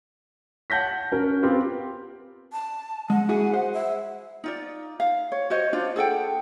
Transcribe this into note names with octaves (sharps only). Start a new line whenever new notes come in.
F#5 A5 G6 A#6 B6
C#4 F#4 A#4
B3 C4 F4 G4
A5
G#3 F#5
E4 F#4 G#4
C5
E5
D#4 F4 D5
F5
C#5
F#4 C5 C#5 D#5
D4 F4 C5
G#4 A4 F#5 G5